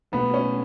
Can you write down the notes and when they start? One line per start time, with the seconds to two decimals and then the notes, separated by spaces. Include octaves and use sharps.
0.13 B1 B2 A3 B3 D4
0.34 C#4